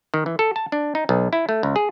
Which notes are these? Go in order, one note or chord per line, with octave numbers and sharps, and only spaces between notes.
D#3
E3
A4
A5
D4
D#4
B1
E4
A3
C#2
G#4